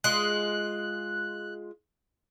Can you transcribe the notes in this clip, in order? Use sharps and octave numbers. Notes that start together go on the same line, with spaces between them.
G#3 F4 F#6